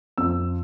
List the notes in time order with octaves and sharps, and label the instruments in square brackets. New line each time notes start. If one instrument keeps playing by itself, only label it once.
[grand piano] F2 E6